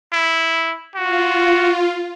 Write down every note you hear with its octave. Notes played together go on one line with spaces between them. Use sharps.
E4
F4 F#4